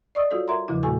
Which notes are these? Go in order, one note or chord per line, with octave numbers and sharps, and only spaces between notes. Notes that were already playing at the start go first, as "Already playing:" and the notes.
D5 D#5 C#6 D#6 E6
G3 F4 F#4 A4 C#5
A#4 E5 F#5 A#5 C6
E2 C#3 F3 G3 E4
A#2 A3 F#4 A4 G#5 C#6